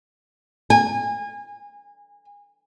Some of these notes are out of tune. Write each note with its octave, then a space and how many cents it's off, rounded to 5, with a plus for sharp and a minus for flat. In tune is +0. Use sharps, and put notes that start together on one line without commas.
G#5 -30